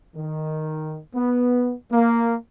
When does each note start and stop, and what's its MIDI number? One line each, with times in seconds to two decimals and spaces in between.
0.15 0.97 51
1.15 1.73 59
1.92 2.35 58